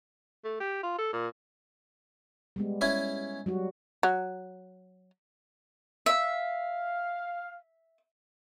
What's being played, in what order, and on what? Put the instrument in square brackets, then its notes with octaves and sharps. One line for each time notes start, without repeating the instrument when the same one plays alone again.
[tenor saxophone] A3
G4
F4
A4
A#2
[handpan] G3 G#3 B3
[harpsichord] C#4 E4 G#5
[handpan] F#3 G3 F#4
[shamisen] F#3
[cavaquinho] E5 [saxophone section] F5